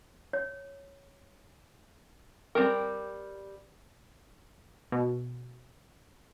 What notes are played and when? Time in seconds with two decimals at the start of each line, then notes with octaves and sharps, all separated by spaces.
0.33 C#5
2.55 G3 C4 G4 A#4
4.92 B2